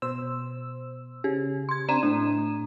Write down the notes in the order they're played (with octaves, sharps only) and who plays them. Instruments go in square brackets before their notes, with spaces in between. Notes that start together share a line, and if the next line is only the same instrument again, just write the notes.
[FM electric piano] B2 C5 E6
[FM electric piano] C#3 [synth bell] G4
[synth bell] C6 G#6
[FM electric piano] C4 D4 [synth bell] A#5 D#7 E7
[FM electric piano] A2 [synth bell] D4